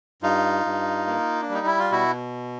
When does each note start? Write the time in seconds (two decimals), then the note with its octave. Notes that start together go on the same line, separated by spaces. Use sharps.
0.22 G2 D#4 F4
0.65 G2
1.07 A#3
1.42 D4
1.49 G3 D#4
1.66 E4
1.79 F4
1.91 B2 E4 F#4